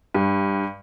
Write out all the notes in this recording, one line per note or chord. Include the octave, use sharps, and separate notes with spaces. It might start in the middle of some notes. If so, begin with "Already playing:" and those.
G2